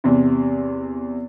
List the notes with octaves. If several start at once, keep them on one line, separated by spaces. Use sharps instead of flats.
E2 C3